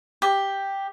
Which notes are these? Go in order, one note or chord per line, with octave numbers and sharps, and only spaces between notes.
G4